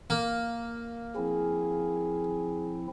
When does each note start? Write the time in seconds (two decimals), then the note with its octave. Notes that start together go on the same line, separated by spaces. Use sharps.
0.10 A#3
1.16 F3 C4 E4 G#4